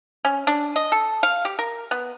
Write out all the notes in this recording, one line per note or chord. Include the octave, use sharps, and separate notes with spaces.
C#4
D4
D#5
A4
F5
G4
A#4
B3